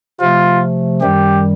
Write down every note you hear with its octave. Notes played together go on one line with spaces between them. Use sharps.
C3 F3 A3 F4
F#2 D#3 G3 G4